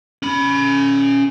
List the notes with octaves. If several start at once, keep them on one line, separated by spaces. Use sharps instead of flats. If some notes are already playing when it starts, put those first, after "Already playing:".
C#4 B5